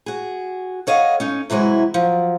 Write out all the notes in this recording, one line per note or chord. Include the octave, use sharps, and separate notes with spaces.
F#4 G#4
A4 C#5 D#5 F5 F#5
C#4 D#4
C3 E3 F#3 G#3 E4
F3 F#3